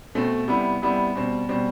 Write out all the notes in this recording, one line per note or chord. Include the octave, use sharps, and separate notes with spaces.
B2 A3 C4
C3 G3 B3 E4
C3 G3 B3 E4
B2 G3 C4
B2 G3 C4